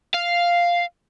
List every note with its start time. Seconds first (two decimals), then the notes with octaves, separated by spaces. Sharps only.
0.14 F5